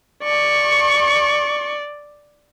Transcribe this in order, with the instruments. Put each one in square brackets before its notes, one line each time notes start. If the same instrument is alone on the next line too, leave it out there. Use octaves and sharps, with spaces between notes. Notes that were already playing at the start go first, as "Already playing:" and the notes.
[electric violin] D5 [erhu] C#6